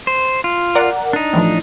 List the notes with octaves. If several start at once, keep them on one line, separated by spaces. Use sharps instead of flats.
C5
F4
A#4 D5 F#5
D4 D#4
A2 E3 F3